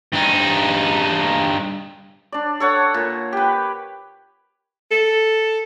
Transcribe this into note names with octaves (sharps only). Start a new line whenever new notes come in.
G2 D#4
D4 D5
A4 C#5 F#5
A#2
G4 B4
A4